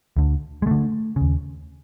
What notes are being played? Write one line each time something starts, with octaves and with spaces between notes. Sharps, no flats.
D2 D3
G#3
D2 D3 A3
D#2 C#3